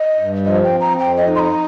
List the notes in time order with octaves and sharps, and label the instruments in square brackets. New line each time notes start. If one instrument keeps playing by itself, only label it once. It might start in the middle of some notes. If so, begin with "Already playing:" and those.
Already playing: [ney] D#5
[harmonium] G2
[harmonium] F3 [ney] D#5
[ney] G5
[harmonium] C4
[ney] A#5
[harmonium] F2 [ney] G5
[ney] D#5
[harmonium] D#4
[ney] C6
A#5